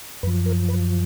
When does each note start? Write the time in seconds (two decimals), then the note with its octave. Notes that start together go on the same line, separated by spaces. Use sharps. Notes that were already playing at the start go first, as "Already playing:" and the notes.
0.23 F#2 F3 B4
0.46 A#4
0.68 B4